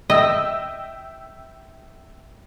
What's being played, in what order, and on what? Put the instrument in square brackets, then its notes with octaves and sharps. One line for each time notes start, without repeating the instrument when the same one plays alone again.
[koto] D#5 [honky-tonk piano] E5 G5 E6